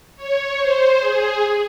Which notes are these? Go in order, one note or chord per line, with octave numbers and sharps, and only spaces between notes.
C#5
C5
G#4